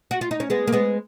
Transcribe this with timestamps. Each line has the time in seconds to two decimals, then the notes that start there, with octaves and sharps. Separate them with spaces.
0.11 F#4
0.21 F4
0.31 D#4
0.40 C#4
0.50 G#3 B3
0.67 A#3
0.72 G#3 B3